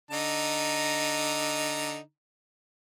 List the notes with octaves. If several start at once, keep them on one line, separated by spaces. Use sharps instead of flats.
D3 D#4 A#5